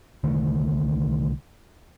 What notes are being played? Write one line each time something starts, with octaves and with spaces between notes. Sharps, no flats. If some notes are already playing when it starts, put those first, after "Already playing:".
C2 D3 D#3 A3